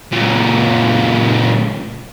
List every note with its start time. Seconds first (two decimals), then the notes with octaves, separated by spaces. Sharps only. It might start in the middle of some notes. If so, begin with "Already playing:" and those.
0.12 C#2 A#2